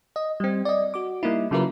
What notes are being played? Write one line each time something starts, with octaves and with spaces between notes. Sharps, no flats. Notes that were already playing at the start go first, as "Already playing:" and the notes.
D#5
G3 C4
D5 D#5
F#4 D6
G3 A#3 D#4 E4
C#3 F#3 E4 F4 A#4 B4